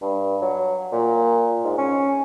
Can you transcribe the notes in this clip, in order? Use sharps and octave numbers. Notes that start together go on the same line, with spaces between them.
G2
F#3
A#2
G#2
C#4